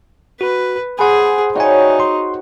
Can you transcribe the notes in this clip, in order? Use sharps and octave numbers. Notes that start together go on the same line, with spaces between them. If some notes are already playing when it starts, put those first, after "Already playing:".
F#4 B4
G#4 B4 C5 F#5 G#5
D#4 F#4 C#5 D5 E5 G5 G#5
C6